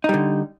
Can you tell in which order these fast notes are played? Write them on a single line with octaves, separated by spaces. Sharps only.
D#4 G3 D3